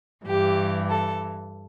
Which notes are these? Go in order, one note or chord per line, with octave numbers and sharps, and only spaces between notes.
G2 E3 G4
A4